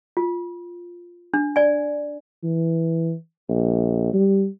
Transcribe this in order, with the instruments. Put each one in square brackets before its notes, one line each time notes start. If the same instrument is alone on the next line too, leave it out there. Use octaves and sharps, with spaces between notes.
[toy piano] F4
D4
D5 G#5
[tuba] E3
A#1
G3